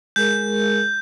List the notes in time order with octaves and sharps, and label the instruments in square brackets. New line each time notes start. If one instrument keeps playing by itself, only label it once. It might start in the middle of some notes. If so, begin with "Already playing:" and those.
[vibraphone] G#3 G#4 A#4 [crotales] G6